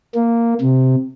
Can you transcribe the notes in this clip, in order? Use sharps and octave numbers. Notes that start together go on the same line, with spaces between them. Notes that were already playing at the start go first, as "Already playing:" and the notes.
A#3
C3